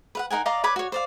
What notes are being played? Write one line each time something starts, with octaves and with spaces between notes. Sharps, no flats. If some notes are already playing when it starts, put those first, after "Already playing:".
B4 F5 F#5
D#4 A#4 F#5 G#5
D5 D#5 F5 A#5
B4 C#5 B5 D6
F#4 C#5
C5 D5 F5